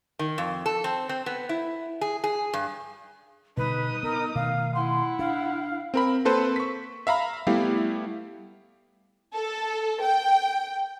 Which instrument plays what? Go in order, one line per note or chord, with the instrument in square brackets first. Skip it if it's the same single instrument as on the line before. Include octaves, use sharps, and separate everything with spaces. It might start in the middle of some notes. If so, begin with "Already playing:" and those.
[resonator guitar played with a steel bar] D#3
F2
A4
C4
C4
B3
E4
G#4
G#4
G2
[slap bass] B2 D3 G3 [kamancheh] D#4 D#6 [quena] B4
[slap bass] B3 [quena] A#4
[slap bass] B2 D#3 A3 [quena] F5
[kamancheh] E4 F#5 [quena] C6
[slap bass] D4 [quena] F5
[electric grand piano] C4 A#4 B5
A#3 C4 A4 B4 C5
C#6 B6
E5 F5 A#5 B5
G3 A3 B3 E4 G4 F5
[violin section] A4
G5